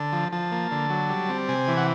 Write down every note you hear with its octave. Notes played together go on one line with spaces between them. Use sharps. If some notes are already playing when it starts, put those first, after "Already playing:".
Already playing: D3 A5
F3
F3 A5
A#3
D3
F#3
G3
C4
C3 G#5
E3
F#5